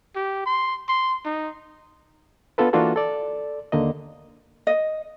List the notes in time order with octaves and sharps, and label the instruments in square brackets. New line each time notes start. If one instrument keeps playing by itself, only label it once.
[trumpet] G4
C6
C6
D#4
[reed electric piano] B3 D4 F4 A4 B4
E3 A#3 D4 F4 F#4 A4
A4 D5
D#2 D3 A#3 D#5
[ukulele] D#5